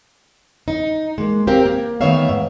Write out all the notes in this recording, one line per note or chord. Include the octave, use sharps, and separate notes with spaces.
D#4
G#3 A#3
C4 G4 A#4 F5
A#3
D#3 A3 B3 C#5 E5 F5
G#2